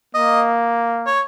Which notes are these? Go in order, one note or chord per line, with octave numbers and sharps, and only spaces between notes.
A#3 D#5
C#5